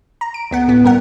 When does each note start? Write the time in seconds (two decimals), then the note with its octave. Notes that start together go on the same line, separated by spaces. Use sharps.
0.21 A#5
0.34 D7
0.51 D2 B3 F#5
0.68 A1 B3
0.84 G2 A#4 F#5